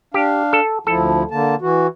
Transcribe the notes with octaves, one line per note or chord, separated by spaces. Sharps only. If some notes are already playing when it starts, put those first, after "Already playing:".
D4 G4 F5
A4
D2 F3 E4 A4
D3 A#3 A5
E3 F#4